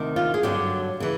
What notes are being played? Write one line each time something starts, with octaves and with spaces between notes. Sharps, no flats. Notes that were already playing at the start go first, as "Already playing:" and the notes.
Already playing: D2 C3 D#3
F4
G#4
G2 D3 F#3 G4
C#3 E3